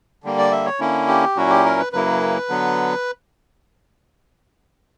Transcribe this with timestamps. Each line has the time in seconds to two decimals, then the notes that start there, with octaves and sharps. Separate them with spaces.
0.24 D3 G3 A#3
0.38 D5
0.51 E5
0.65 C#5
0.80 D3 A#3 C#4 E4
1.08 G4
1.36 A#2 F#3 C#4 E4 F#4
1.50 G4
1.65 A#4
1.79 B4
1.93 F#2 C#3 F#3 A#3 E4 B4
2.49 D3 F#3 B3